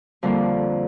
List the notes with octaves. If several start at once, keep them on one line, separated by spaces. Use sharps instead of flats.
F2 D3 G3 A#3 F4